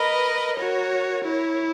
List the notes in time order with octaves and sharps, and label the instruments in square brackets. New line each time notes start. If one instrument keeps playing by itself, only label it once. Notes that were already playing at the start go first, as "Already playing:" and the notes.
Already playing: [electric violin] A#4 [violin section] B4 D#5
[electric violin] F#4 [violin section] A#4 C#5
[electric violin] E4 [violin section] A#4 C#5